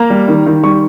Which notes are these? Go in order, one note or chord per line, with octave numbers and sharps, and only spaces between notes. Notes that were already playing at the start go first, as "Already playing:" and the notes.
Already playing: A#3 A#5
G3
D#3
D#3
G3 C#6